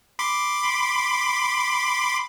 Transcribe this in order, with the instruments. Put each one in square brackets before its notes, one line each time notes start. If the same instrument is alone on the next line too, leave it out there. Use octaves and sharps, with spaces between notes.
[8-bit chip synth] B5 C6 D6